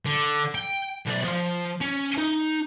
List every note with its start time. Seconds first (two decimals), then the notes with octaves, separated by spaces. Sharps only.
0.05 D3
0.55 G5
1.06 B1 D5
1.24 F3 C6
1.81 C#4
2.18 D#4